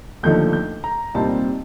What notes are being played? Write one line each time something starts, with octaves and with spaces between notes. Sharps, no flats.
D#2 D3 F3 A3 D#4 G6
G6
A#5
C2 A#2 G3 C4 D#4 A5